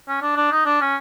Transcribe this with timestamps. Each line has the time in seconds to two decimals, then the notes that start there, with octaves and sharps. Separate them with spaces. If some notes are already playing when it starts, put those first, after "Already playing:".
0.08 C#4
0.22 D4
0.36 D4
0.52 D#4
0.66 D4
0.81 C#4